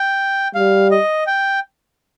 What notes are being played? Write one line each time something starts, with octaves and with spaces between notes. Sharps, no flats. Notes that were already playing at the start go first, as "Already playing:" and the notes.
Already playing: G5
G3 F5
D#5
G5